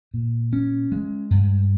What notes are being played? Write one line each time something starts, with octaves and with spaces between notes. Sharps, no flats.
A#2
C#4
G#3
G2